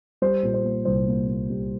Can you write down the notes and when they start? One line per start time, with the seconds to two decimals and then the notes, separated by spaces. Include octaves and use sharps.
0.22 G3 C5
0.43 A#2
0.54 C5
0.64 A#3
0.85 C2 C5
1.07 A#3
1.28 A#3
1.50 G3